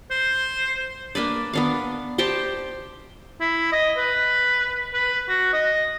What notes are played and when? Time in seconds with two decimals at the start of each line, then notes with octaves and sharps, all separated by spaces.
0.11 C5
1.15 A#3 D4 B4 D5
1.53 B3 D4 F5
2.18 G4 C5 G5 A5
3.40 E4
3.72 D#5
3.97 B4
4.94 B4
5.28 F#4
5.53 D#5